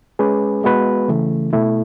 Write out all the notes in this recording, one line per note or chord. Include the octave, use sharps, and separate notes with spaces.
G#3 C#4 G#4 B4
G#3 B3 F#4 B4
C#3 E3 A3
B2 A3 E4